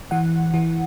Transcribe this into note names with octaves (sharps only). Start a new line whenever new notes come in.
E3 F#5
E3